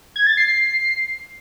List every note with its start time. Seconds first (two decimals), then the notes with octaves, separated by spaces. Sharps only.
0.16 G#6
0.27 A6
0.37 C7
0.48 C7